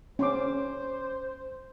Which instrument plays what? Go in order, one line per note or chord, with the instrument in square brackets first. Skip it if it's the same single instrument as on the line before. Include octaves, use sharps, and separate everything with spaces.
[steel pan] C#4 C6 D6 [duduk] C5